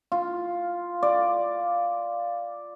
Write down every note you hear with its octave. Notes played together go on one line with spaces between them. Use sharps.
F4
D5